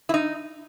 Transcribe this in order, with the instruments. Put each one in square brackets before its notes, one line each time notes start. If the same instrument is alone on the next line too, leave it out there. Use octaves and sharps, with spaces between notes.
[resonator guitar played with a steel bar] E4
D#4